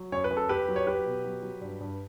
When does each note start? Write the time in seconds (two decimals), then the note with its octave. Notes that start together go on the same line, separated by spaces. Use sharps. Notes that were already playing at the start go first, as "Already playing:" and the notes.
Already playing: F#3
0.12 F#2 C#5
0.24 B4
0.31 F#2
0.37 A4
0.49 F#2 G4 B4
0.68 F#3
0.76 C#5
0.87 F#3 G4 B4
1.06 B2
1.24 F#3
1.43 F#3
1.61 G2
1.81 G2